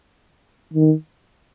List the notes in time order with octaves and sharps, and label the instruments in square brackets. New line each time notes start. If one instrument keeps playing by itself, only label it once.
[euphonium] D#3